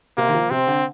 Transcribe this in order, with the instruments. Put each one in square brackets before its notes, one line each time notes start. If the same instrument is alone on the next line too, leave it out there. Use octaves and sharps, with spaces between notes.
[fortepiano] C3 [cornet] A#3
[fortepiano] D#3
F3
[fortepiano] C3 [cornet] C4
[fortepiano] D3